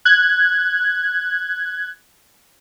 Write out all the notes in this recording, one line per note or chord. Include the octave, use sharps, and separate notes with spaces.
F#6 G#6